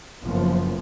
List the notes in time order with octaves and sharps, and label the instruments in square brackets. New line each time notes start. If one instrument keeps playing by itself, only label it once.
[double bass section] F#1 F#2 F3 B3